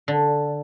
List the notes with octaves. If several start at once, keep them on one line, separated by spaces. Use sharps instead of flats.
D3